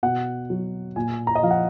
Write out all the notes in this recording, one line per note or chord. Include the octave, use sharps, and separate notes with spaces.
B2 F#5
F#3
A#2 G#5
A#5
D#5
F3 F5
F#5